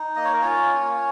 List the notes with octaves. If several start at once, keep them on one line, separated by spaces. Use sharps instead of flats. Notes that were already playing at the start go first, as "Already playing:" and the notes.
Already playing: D#4
A#3 D#5
C#5
A#4
C#4 F4 C#5
A#3